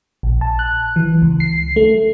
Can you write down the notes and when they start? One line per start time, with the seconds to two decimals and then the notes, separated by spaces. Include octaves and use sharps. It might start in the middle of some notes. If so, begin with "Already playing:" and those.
0.23 A#1
0.41 A5
0.59 F#6
0.96 E3
1.22 C#2
1.40 C7
1.76 A3